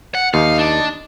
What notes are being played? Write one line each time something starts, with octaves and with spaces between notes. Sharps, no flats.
F#5
D#2 D#4 F5
D4